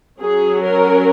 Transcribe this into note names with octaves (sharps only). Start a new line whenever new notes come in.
F#3 C#4 G#4
A#4